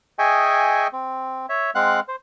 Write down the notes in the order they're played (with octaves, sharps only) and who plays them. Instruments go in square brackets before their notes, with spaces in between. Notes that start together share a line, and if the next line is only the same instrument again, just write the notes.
[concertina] G#4 D#5 E5 G5 G#5 C#6
C4
C#5 E5
G#3 C4 F5 F#5 F#6
C5